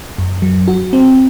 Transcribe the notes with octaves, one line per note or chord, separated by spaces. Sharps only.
F#2
F#3
F#4
C4